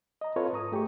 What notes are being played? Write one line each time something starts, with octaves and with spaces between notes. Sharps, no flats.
D#5 A#5
C4 F4 A4 B4 C#5
G#2 A#5 D#6
A3 G4 G#4 C#6